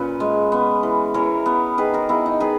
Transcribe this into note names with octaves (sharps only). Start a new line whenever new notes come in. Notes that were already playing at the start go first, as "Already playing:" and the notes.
Already playing: A#2 C#4 B4
G#3
B3
E3
E3 A#4 C#5
B3
D#3 G#4 B4
F#4 A#4
B3 E4 G#4
D#4
D#3 G#4 B4